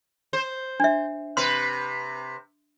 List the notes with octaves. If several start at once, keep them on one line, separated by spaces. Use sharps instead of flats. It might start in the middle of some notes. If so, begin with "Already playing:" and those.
C5
D4 E5
C3 B4 C6